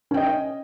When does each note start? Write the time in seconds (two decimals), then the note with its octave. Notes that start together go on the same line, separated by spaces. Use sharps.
0.11 C#4
0.14 G5
0.17 D#5